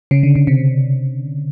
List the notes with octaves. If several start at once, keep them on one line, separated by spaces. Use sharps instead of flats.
C#3
D3
C#3
C3